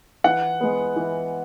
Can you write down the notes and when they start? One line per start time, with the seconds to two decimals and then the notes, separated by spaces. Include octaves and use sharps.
0.24 E3 F#5
0.61 G#3 B3
0.96 E3